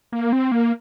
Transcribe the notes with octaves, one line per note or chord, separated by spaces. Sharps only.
A#3
C4
A#3